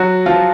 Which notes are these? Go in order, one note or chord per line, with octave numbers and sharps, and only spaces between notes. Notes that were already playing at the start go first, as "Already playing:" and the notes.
Already playing: F#3 F#4
F3 F4